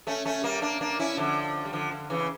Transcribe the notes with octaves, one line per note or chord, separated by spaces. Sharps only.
A3 C#4
A3 C#4
G3 A#3
A#3 D4
A#3 D4
C#4 E4
D3 F3
G3
D3 F3
D3
C#3 E3